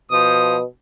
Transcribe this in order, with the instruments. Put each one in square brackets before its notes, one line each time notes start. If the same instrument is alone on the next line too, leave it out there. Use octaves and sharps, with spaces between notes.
[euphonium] B2 [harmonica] F3 D#6